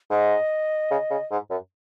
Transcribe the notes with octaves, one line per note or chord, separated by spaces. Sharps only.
G#2 D#5
C#3
C#3
G#2
F#2